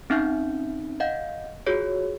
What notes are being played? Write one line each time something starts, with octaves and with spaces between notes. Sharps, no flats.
C4 C#4 D#4 E5 F6 G6
D#5 F5 F#5 G6
F4 F#4 G#4 C#5